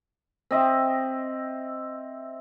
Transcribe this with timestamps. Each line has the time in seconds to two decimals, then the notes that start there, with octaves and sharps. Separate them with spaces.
0.51 C4 D#5 E5